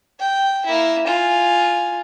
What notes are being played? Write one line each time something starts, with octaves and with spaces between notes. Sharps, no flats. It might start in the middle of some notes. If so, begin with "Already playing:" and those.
G5
A#3 E4
F4 G#5